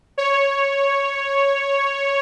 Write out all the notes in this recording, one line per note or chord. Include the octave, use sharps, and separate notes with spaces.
C#5